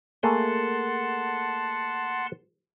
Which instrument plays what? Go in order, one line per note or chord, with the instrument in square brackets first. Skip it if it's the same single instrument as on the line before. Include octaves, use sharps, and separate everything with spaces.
[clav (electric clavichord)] A3 A#3 G#4 [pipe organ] F#5 A5 C6